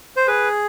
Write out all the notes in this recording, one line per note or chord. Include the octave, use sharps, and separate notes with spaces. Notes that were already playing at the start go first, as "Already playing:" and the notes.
C5
G#4 B4